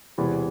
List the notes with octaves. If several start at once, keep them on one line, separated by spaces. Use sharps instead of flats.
E1 E2 C3 E3